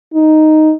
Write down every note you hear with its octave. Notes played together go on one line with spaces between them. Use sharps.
D#4